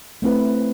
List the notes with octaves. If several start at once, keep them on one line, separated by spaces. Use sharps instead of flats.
A3 C4 E4 B4